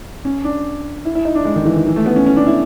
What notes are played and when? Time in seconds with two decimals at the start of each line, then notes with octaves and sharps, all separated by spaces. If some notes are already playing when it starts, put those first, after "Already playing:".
0.25 C#4
0.44 D4
1.05 E4
1.15 E4
1.25 D#4
1.35 D4
1.45 G#3
1.56 D#3
1.65 E3
1.76 D#3
1.86 E3
1.96 A3
2.06 B3
2.16 C#4
2.26 C#4
2.37 D4
2.47 E4